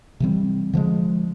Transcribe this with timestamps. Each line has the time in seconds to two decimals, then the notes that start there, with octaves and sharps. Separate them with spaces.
0.20 C3 E3 G3 C4
0.73 D3 F3 G#3